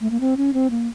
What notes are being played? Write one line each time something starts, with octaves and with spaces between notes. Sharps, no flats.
A3
A#3
C4
C#4
C4
A#3